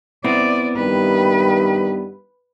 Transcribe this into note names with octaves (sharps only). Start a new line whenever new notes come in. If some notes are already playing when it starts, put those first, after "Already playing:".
B3 C4 E4 D5
G2 D#3 G3 B4